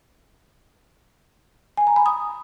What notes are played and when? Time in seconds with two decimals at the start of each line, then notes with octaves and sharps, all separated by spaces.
1.77 G#5
1.87 A#5
1.96 B5
2.06 D#6